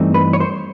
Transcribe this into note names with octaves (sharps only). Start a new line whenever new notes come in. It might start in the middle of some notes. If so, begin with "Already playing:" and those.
Already playing: G2 E3 A3 C4 D#4
B4
C#5
C5